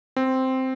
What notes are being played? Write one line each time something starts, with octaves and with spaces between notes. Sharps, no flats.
C4